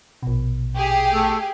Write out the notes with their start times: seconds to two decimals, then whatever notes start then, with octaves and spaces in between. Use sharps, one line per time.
0.23 A#1 B2
0.75 G4 G#4
1.13 A3 A4